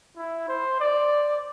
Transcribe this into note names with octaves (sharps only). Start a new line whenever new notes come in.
E4
C5
D5